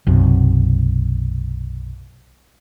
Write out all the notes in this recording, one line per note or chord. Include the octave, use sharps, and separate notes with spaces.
B1 F#2 C3